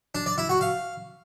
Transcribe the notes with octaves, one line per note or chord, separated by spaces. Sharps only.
D4
D5
E4
F#4
F5